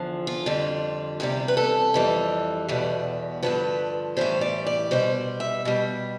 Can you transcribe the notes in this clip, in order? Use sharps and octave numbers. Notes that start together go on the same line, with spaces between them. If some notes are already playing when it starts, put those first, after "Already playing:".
Already playing: E2 D3 F3
F4
F2 D3 G3
E2 C3 G3 G4
B4
A4
F2 E3 G3
E2 B2 G3
G2 D3 F3 B4
A2 E3 G3 C5
D5
D5
B2 G3 C5
E5
B2 G3